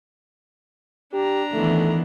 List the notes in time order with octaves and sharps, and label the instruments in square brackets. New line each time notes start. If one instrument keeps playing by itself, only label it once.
[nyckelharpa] D4 A#5 [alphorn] G4
[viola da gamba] D#3 E3 B3 [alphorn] A3